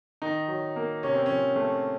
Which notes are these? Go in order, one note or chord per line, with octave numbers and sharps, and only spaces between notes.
D#3 D#4
F#3
A#3
C3 C#4
C4
F3 C#4
A3